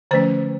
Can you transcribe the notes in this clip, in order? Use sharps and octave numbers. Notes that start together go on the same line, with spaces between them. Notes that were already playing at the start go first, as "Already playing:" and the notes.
D3 F3 A3 C#4 C5